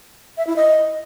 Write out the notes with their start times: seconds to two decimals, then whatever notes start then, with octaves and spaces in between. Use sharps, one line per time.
0.38 E5
0.47 E4
0.56 D#5